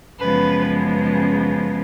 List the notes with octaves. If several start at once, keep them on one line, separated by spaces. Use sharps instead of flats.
F#2 C#3 F3 G#3 B3 B4